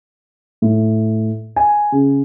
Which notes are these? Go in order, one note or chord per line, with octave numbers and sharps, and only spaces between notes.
A2
G#5
C#3